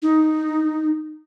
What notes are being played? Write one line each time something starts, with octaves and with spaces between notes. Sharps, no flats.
D#4